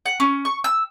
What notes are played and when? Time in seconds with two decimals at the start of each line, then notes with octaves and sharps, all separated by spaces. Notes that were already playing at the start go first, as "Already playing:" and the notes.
0.06 F#5
0.20 C#4
0.45 C#6
0.64 E6